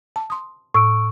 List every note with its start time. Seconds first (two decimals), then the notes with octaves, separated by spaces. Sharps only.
0.16 A5
0.30 C6 D#6
0.74 A2 C#6 E6 D7